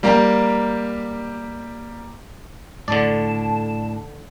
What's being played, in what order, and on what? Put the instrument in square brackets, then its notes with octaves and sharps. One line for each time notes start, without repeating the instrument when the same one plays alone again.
[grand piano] G3 A#3 G4 A#5
[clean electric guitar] A2 D4 [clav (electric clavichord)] D3 D5 [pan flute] A5